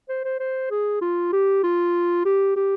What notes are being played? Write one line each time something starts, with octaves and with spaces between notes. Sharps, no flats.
C5
C5
C5
G#4
F4
G4
F4
G4
G4